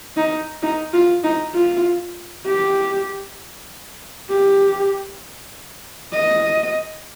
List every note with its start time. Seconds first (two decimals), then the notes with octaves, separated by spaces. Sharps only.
0.17 D#4
0.63 D#4
0.93 F4
1.24 D#4
1.54 F4
2.46 G4
4.29 G4
6.13 D#5